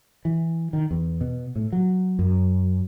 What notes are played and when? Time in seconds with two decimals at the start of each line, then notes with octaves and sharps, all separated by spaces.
0.25 E3
0.73 D#3
0.91 E2
1.21 B2
1.56 A2
1.72 F#3
2.19 F#2